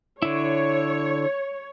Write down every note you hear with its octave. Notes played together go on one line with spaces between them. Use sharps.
D3 E4 C#5